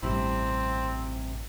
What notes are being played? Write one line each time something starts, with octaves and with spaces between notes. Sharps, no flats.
A1 G2 C3 C4 E4